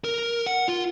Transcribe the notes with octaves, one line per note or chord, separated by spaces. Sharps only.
A#4
F#5
F4